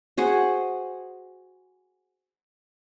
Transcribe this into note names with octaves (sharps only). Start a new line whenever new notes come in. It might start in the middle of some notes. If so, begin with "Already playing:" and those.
F#4 G#4 C5 F#5